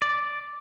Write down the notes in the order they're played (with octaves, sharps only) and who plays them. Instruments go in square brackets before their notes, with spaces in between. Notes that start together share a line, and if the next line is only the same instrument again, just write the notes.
[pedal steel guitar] D5